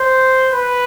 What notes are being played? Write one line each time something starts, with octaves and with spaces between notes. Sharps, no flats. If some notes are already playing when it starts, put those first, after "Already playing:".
Already playing: C5
B4